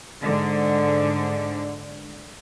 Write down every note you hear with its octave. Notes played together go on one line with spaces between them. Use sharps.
G#2 D3